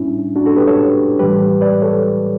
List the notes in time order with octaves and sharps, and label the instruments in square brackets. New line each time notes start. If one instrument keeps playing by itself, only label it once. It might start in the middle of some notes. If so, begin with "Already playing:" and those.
Already playing: [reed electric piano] A2 G3 C#4 D4 E4
D4 F#4
F#4 A4
G4 B4
A4 C#5
A2 E3 G3 G4 B4
B4 D5
A4 C#5